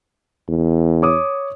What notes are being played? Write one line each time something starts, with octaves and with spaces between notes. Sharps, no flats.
E2
C#5 D6 D#6